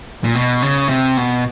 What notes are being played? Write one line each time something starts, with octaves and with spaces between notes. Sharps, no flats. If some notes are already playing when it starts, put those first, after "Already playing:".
A#2
B2
C#3
C3
B2